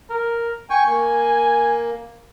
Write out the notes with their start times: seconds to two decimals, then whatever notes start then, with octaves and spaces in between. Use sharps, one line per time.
0.10 A#4
0.70 G5 G#5 C#6
0.87 A#3